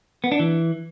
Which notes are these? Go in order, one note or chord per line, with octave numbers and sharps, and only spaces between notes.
B3
D4
E3